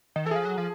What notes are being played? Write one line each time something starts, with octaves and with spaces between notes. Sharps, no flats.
D#3
E3 A4
F3 G#4
F#3
F3